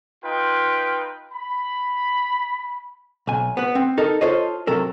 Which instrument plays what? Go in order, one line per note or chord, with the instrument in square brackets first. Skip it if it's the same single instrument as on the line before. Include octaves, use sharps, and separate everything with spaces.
[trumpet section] D#4 F4 B4 G5
B5
[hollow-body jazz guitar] B1 G#5
B3 B4
C4
D#4 A4 A#4
F4 A4 C5 C#5 D#5
C3 F#3 A4 A#4